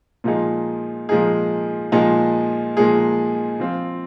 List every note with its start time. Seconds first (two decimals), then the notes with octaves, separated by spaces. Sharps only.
0.24 A#2 F3 G#3 D#4 G#4
1.09 A#2 F3 G#3 D#4 G#4
1.92 A#2 F3 G#3 D#4 G#4
2.77 A#2 F3 G#3 D#4 G#4
3.60 F3 C4 F4